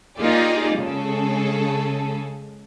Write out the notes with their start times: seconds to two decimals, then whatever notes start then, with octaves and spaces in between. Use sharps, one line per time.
0.19 A#3 D#4 F4 G4 G#4 D5
0.77 C#3 G#3 G#4 A4